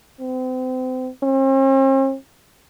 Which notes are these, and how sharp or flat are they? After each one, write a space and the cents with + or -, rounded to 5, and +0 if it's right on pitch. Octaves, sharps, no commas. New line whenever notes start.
C4 -35
C4 +45